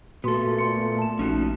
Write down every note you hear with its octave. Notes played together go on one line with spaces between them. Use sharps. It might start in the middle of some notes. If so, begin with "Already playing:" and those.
A#2 A3 B3 F#4 A4 C6
C6 C#7
A5 E7
A#1 C#4 D#4 F#4